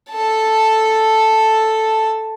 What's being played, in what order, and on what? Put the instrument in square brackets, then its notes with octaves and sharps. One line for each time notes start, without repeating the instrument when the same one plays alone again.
[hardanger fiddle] A4 A5